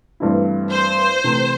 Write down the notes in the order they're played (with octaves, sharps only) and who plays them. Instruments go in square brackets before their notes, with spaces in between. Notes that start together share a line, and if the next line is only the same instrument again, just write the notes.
[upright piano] G2 E3 A3 C4 E4
[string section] C5
[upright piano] C3 E3 A3